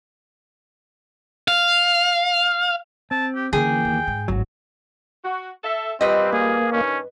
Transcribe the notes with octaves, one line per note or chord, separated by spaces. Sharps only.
F5
C4 A5
G4
D3 E3 A#3 C#4 G#4 G5
D#2
G#2
G#1 A2 F#3 F#4
F#4
A4 E5
A#2 G3 C4 B4 D#5
A#3 G#4
G2 D#3 C#4